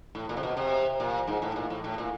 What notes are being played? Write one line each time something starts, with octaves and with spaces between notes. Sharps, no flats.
A2
A#2
C3
B2
C3
A#2
G#2
A2
A#2
A2
A2
A#2